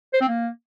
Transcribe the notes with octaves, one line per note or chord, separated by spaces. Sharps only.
C5
C4
A#3